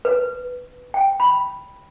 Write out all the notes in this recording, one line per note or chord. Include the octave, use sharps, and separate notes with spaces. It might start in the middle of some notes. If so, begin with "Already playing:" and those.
B4
G5
B5